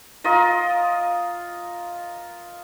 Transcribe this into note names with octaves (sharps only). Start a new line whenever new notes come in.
F4 A#4 D#5